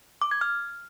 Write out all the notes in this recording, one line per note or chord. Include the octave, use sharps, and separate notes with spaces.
D6
G#6
F6